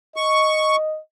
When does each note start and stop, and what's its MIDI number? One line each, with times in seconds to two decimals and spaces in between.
0.16 1.00 75
0.16 0.76 85